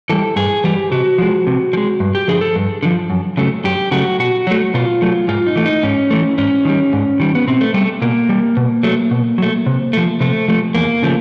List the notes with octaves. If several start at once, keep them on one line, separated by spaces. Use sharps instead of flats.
E3 G3 A4
G2 G#4
E3 G3 G4
C3 F#4
F3 G#3
C3
F3
G#3
G2
G4
D3 F3 G#4
A4
G2
D3 F3
F#2
C#3 F#3 A3
F#2 G4
C#3 F#3 A3 F#4
B2 F#4
F#3 A3
B2 F4
F#3 A3
G#2 F4
D#4
E3 A3
D#4
G#2 C#4
E3 A3
G#2 C#4
D#3 G3
G#2
D#3 G3
B3
B2 C4
A3
G3 A3
B2 A#3
G3
B2
F#3 A3
B2
F#3 A3
C3
F3 A3
C3 A3
F3 A3
E2 A#3
C#3 F3 A3